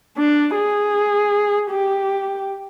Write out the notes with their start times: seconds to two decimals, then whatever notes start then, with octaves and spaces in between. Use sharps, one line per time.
0.17 D4
0.55 G#4
1.70 G4